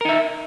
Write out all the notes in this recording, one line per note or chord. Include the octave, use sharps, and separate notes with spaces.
D#4 A#4 E5